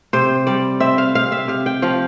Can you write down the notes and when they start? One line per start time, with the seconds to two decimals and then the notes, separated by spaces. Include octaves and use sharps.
0.13 C3 C5
0.47 G3 D5
0.80 C4 E5
0.98 F5
1.15 C3 F5
1.32 E5
1.48 C3 F5
1.66 G5
1.82 F3 F5